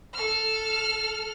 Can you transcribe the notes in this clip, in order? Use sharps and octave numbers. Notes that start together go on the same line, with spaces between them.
A4 F6